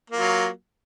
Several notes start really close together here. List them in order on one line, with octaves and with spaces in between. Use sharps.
A#3 F4 F#3